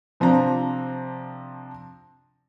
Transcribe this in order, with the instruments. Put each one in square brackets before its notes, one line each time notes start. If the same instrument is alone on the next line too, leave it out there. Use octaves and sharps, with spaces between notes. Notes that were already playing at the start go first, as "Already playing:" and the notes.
[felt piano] C3 F3 C4 D4 A#5